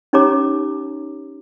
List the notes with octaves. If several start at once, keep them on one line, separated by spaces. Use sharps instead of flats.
C#4 D#4 G4 C#5 A#5 D6